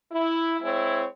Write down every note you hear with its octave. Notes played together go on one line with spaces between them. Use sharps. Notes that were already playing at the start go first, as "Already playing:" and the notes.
E4
G#3 C4 E4 C#5